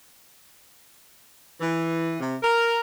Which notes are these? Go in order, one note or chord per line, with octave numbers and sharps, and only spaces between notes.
E3
C3
A#4